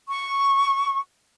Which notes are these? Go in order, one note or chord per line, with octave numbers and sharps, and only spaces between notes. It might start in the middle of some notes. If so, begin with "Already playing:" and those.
C#6